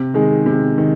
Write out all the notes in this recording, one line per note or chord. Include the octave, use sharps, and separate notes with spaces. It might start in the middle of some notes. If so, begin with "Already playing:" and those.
Already playing: C3
D#3 G#3
C3
D#3